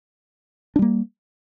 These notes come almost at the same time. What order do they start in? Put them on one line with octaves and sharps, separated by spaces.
D4 G3 A#3